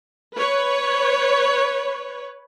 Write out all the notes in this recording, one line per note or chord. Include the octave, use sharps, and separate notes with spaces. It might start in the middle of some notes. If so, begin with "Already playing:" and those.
B4 C#5